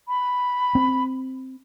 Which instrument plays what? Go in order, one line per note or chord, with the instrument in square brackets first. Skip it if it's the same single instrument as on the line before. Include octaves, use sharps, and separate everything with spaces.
[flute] B5
[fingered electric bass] C4